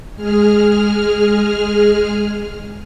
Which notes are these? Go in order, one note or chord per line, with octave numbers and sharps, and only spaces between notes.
G#3 G#4 F6